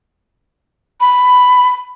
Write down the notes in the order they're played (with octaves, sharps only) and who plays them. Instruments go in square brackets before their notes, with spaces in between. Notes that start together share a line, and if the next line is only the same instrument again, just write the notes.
[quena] B5